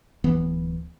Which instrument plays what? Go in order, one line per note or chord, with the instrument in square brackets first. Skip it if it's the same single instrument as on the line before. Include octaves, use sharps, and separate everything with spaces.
[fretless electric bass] D1 E3 B3